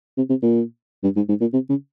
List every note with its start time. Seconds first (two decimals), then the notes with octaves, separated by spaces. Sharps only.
0.17 C3
0.29 C3
0.42 A#2
1.03 G2
1.16 G#2
1.29 G#2
1.41 A#2
1.53 C3
1.69 C#3